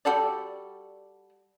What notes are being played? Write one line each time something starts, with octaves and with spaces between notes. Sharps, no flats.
G3 F#4 A4 D5